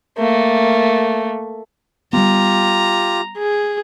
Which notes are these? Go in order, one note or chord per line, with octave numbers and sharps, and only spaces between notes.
A3 A#3
G3 G#3 B3 F4 G4 A#5
G#4